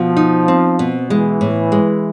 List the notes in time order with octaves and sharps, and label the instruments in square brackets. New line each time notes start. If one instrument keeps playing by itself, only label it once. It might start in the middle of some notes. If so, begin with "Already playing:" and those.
Already playing: [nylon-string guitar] B2 [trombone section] F3
[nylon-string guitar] D#4
C4
B2
[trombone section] E3 [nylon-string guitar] G#3
[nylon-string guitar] A2
G#3